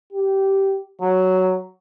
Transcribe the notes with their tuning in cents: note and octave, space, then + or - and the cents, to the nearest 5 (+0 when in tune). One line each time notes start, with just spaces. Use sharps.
G4 -15
F#3 +5